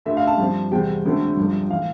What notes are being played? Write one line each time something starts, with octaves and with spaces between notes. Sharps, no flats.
D2 D3 A3 E5
F5
A5
G2 F3 C4
E2 C3 G3 C4 G5
E1 D2 D3 A3 C4
G1 G2 F3
A2 E3 F5